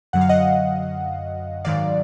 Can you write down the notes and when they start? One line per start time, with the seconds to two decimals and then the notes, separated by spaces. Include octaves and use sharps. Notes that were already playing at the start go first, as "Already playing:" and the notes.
0.13 F#2 D3 F#3 F#5
0.21 F5
0.29 D#5 F#5
1.64 G#2 D#3 F#3 D5 F5